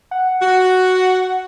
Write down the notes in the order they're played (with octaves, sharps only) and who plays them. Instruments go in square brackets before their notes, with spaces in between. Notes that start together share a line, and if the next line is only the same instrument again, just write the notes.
[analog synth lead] F#5
[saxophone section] F#4